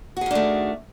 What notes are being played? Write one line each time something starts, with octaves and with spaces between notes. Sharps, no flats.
D#3 A3 D4 F#4 G#4